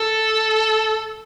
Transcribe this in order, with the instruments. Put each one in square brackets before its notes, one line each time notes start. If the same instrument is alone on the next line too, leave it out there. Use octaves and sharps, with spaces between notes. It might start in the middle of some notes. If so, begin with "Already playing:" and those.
Already playing: [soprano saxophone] A4